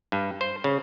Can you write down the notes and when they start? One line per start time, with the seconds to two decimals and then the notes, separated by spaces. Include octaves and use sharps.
0.12 G2
0.41 C5
0.64 C#3